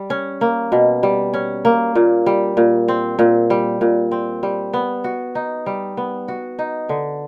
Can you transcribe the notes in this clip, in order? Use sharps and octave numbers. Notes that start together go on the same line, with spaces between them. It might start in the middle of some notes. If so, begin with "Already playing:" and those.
Already playing: G3
C#4
A#3
B2
G3
C#4
A#3
A#2
G3
A#2
C4
A#2
G3
A#2
C4
G3
B3
F#4
D#4
G3
B3
F#4
D#4
D3